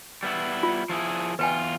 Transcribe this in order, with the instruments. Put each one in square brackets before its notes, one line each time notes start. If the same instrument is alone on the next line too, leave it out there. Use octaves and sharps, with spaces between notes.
[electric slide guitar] G3 B3 E4
[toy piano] F4
[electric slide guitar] F3 E4 G#4
[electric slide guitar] E2 F4 [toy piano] B4 G5 G#5